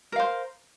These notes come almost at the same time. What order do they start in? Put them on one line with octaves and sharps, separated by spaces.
A#4 F5 C5